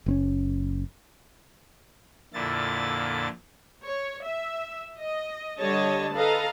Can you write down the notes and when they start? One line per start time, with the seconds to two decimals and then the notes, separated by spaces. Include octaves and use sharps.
0.06 F#1 C4 C#4
2.34 F2 A#2 D3 E4 A6
3.85 C#5
4.26 E5
5.00 D#5
5.60 D3 G3 C#5 D#5 A5
6.15 A4 B4 D#5 F5 A#5